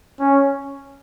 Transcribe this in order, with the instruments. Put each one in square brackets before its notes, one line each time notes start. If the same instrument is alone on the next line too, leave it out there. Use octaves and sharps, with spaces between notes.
[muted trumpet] C#4